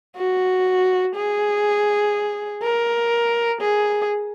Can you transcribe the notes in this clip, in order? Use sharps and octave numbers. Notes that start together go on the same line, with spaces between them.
F#4
G#4
A#4
G#4